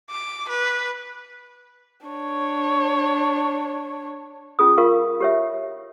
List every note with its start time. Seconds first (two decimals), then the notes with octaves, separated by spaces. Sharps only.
0.10 D6
0.49 B4
2.06 D4 C#5
4.59 C#4 F4 G#4 D#6
4.78 F4 A#4 F5 C#6
5.20 G4 C#5 E5